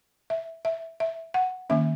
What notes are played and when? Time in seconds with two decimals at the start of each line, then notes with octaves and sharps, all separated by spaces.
0.30 E5
0.65 E5
1.00 E5
1.34 F#5
1.70 D#3 A#3 C#4 E5